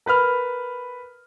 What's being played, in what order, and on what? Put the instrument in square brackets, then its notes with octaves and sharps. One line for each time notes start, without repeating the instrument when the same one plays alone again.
[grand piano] A#4 B4 B5 F6